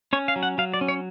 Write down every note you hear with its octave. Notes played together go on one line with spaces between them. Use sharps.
C#4 C#5
F5
F#3
F#5
F#3 F5
D5
C#4
C#5